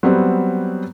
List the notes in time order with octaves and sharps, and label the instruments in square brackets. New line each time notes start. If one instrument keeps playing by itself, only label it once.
[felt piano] F#3 G3 B3 C4